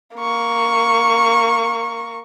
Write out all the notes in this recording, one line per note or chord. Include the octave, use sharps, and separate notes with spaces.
A#3 C#6